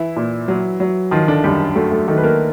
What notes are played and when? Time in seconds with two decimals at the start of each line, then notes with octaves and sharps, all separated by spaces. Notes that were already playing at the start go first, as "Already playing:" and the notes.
Already playing: E3 E4
0.16 A#2
0.48 F#3
0.80 F#3
1.11 D#3 F3 F4
1.28 D3 D4
1.44 F#2 G3 G4
1.75 F#3 A3 A4
1.91 A3 A4
2.08 D#3 A3 A4
2.17 B4
2.24 A#3 A#4